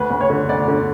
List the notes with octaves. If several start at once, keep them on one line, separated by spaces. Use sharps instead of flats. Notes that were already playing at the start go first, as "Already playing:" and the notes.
Already playing: D2 B4
D2
C#5
D3
D2 D5
D3